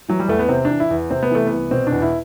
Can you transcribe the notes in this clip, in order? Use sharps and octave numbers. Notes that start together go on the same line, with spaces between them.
E3 F#3
G3
E2 A3
B3
C3 C4
D4
E3
E4
E2
C3 C4
B3
E3 A3
C2 B3
B2 C4
D4
E2
E4